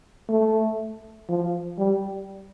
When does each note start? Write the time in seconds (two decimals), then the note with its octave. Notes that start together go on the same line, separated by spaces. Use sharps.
0.29 A3
1.29 F3
1.78 G3